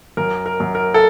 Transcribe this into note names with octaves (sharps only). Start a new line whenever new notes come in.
F#2 A#4
A#4
F#2
A#4
A4